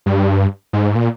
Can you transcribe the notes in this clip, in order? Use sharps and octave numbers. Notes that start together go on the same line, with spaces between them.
G2
G#2
A#2